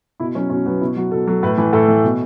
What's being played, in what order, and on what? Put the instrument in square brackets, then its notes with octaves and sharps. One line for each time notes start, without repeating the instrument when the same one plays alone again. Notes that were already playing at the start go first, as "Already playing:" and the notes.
[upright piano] B2 E4
F#3 C#4
B2 C#4
F#3 B3
B2 E4
F#3 F#4
B2 A4
F#3 A4
A2 B4
E3 B4
A2 A4
E3
B2